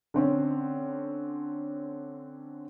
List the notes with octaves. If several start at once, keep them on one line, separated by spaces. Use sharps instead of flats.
D3 C4 C#4